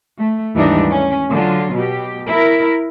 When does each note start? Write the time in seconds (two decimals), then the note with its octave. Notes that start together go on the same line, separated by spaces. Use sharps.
0.20 A3
0.54 D#2 G#2 E3 G3 D4 D#4
0.88 C#4
1.31 D3 F#3 F4
1.73 B2 G4
2.28 E4 A#4